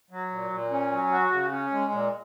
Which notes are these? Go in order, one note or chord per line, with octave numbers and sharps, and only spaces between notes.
F#3
A#2
A#2
C#4
F#3
F#4
C#3
C#4
G#3
A#2